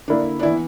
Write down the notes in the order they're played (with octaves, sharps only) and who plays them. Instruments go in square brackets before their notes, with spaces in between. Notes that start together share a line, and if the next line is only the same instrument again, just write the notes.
[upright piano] D3 A#3 E4 [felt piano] D4
[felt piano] D4
[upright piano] E3 B3 [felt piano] E4